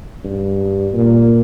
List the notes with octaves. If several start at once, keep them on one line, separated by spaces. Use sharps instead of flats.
G2
A#2